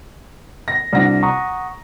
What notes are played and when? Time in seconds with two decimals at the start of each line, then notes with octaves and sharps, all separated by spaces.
0.68 A#6
0.93 C2 D4 F#4 D5 A#6
1.23 F#5 A#5 C#6 D#6